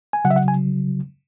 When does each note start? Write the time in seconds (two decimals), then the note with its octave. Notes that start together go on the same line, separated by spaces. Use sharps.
0.13 G#5
0.25 C#3 F#3 F#5
0.31 E5
0.36 F#5
0.48 G#5